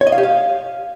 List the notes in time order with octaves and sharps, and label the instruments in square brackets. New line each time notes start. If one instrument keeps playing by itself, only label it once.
[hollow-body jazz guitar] C#5
D#5
F5
G4
F5